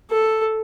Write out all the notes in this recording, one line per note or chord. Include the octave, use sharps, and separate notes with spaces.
A4